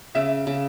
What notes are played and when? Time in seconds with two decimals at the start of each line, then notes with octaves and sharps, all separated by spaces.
0.15 C#3 E5
0.47 C#3